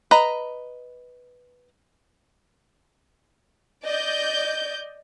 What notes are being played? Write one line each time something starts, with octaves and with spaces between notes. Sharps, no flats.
B4 D#5 A#5
D5 D#5 G6